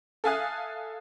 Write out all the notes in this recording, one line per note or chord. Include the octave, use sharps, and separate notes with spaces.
A4 E5 F5 G#5 D#6 F#6